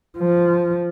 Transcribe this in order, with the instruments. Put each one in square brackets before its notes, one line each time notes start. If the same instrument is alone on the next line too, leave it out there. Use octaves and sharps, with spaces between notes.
[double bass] F3